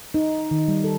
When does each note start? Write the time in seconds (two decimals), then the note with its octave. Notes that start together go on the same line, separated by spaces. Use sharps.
0.14 D#4
0.51 D#3
0.68 G3
0.84 A4